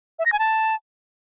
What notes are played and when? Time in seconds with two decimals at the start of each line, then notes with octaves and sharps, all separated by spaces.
0.19 E5
0.26 A#6
0.32 G#5
0.39 A5